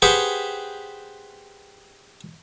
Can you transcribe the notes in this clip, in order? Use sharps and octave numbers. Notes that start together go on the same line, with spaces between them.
G4 G#4 B4 C5 F#5 G5